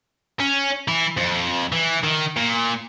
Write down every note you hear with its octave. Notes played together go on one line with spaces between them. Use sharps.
C#4
E3 E4
F2
E3
D#3
A#2